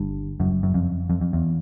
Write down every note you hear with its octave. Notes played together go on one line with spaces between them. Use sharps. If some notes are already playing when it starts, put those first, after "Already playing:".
Already playing: G1 G2
F#1 F#2
F#2
F2
F2
F2
E2